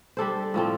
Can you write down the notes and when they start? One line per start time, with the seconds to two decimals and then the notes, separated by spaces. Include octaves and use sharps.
0.17 G3 D4 A4 C5
0.54 A2 F3 C4 A4